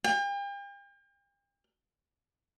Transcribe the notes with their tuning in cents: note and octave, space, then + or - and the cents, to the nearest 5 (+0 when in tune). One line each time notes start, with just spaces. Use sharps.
G5 +40